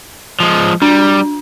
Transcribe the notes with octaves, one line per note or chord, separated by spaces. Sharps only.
F3 G#3
G3 D4